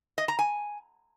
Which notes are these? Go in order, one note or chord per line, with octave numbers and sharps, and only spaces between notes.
D#5
A#5
G#5